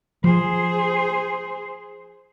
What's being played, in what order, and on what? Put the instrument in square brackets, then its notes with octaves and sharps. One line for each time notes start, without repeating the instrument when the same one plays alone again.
[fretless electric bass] F3 [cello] G#4 C5